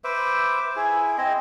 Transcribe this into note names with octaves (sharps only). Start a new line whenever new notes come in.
B4 C5 E5 D6
E4 G#4
C4 D#5